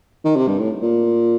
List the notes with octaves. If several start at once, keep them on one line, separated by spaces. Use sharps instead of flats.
D#3
C3
G2
A2
A#2